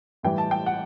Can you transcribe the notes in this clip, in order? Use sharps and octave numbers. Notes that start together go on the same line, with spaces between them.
A2 E3 G3 G5
A5
G5
F#5